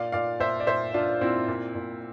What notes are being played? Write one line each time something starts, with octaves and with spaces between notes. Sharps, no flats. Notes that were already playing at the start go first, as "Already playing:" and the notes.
Already playing: A#2 D5 F5
A#2 D5 F5
A#2 C5 E5
D5
A#2 C5 E5
A#2 D4 F4
A#2 C4 E4
A#2
A#2